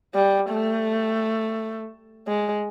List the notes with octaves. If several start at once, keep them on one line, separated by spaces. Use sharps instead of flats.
G3
A3
G#3